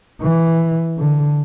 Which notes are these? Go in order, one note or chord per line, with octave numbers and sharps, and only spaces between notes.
E3
D3